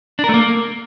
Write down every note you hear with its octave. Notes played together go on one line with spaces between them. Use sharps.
D4
A#4
A3
A#3